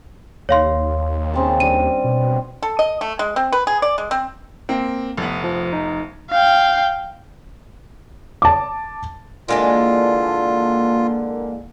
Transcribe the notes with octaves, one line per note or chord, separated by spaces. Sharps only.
D#2 C#5 F5 C6
C#3 C4 A5
G3 D4 D#7
B2
A4
D#5
A3
G#3
C4
B4
G#4
D5
G#3
C4
A#3 C4
F1 B3
F3
D#4
F5 G5
A5 D6
D3 E3 G#3 A#3 D4 F4